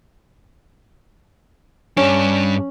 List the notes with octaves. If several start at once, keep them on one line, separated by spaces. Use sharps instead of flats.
G2 C#4 D4